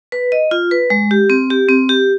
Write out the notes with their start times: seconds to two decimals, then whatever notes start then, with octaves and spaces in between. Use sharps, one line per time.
0.12 B4
0.32 D#5
0.51 F4
0.71 B4
0.90 G#3
1.11 G4
1.30 C4
1.50 G4
1.69 C4
1.89 G4